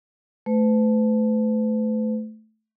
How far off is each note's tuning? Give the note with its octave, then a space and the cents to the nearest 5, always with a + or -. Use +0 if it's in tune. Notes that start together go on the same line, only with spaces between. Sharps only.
A3 -10 B4 +45